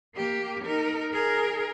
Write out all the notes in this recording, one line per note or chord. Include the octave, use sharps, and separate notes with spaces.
A#3 G4
D#4 A#4
G#4 A#4